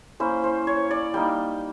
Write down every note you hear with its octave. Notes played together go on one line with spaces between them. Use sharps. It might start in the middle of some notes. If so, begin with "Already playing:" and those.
A#3 C#4 E4 C5
C5
C#5
D5
G3 A#3 D#4 G5